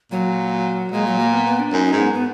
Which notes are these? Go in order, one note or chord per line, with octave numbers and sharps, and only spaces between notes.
A#2 F#3
A#2 G#3
F#3
A#3
B3
B3
D4
F#2 D#4
D#4
G#2
B3
B3